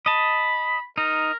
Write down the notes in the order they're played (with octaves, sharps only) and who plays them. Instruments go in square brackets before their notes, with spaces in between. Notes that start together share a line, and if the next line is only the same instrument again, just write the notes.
[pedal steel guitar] D#5 A5 [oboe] B5
[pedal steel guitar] D#4 [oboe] A#4